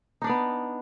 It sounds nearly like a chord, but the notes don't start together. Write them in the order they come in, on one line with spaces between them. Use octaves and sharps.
D#4 D4 D5 B3